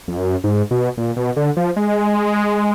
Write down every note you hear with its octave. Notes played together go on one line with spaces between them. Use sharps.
F2
F#2
G#2
B2
A#2
B2
D3
F3
G#3